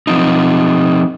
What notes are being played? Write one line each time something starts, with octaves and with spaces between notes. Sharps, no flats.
F3 C4 D#4